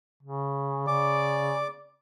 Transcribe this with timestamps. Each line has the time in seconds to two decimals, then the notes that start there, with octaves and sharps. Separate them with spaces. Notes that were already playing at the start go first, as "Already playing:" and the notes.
0.23 C#3
0.88 C#3 D5 D6